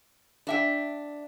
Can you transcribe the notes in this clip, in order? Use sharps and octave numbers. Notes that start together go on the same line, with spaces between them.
D4 E5 G5